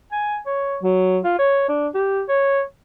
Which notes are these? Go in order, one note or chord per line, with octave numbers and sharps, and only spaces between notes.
G#5
C#5
F#3
F4
C#5
D4
G4
C#5